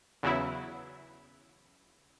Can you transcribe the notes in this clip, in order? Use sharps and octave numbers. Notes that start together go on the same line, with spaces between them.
E2 C#3 F#3 E4